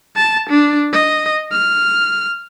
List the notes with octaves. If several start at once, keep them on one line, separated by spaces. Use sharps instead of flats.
A5
D4
D#5
F6